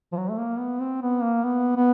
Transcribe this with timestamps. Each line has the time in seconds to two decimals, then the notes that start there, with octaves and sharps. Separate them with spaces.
0.12 F3
0.17 F#3
0.30 A3
0.38 A#3
0.59 B3
0.81 C4
1.02 B3
1.22 A#3
1.44 B3
1.76 B3